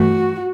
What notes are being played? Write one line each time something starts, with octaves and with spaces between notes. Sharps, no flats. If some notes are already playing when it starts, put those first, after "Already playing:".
Already playing: G2 E3 A3 F#4